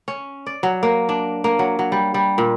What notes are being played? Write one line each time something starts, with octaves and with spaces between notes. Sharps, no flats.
C#4
D5
F#3
A#3
D4
A#3
F#3
F#3
G3
G3
A#2